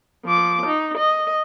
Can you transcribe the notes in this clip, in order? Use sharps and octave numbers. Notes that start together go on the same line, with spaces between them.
F3 D6
D#4
D#5